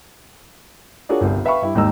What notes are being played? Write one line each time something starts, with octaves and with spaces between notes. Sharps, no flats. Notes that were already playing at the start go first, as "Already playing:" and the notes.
D4 F4 F#4 G#4 A#4 C#5
G1 C2
B4 E5 F5 G5 B5 C#6
G2 E4 G4
G#1 D#2 G#2 D#4 A#5 E6